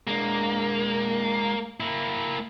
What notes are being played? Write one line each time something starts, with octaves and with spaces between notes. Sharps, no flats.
G#3 A#3 D4
A#3 E4